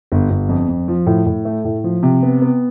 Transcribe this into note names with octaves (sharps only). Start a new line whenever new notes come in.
G1
G1
F2
F2
F3
A2
A2
A3
A2
F3
C3
B3
B3